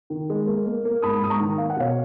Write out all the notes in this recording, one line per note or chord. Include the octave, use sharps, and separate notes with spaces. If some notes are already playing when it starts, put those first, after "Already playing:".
D#3
G#3
A#3
A#3
A#3
G#2 B5 D#6
G#2 D#6
A#5 C#6
D#3
A#3 F5
F#5
B2 C#5 F5